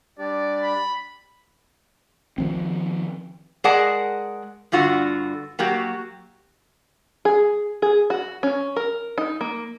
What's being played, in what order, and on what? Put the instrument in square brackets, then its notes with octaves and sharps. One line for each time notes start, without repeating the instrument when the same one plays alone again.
[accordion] G3 D4 G4 [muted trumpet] D5
[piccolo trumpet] B5
[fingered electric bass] D#3 F3 C4
[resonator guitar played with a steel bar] G#3 G#4 A#4 D5 F#5 A5
G2 D3 F4 F#4
F#3 A#3 F#4 G4
[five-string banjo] G#4
G#4
F#4
C#4
A#4
D#4
A#3